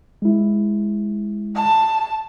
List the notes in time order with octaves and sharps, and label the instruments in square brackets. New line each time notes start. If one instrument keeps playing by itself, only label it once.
[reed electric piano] G#3 E4
[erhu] A5